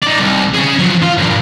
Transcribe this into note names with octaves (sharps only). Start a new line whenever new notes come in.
D#4 D5
C2
C#4 G#4
F3 F#3
F4
G2 A#2